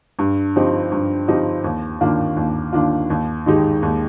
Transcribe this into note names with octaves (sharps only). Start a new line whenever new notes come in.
G2
F3 C4 D#4 G4
G2
F3 C4 D#4 G4
D#2
D#3 A#3 D4 F4
D#2
D#3 A#3 D4 F4
D#2
D#3 G#3 D#4 G4
D#2